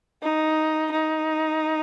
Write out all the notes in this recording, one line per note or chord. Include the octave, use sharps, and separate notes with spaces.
D#4
D#4